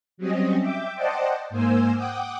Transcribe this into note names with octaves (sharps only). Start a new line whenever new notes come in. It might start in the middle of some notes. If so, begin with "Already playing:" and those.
F#3 G3 C4 C#4 D#5
E5 G5 D6
C5 D5 D#5 F#5 G5 A5
G#2 A#3 C5 G#5 E6
F#5 G5 D6 D#6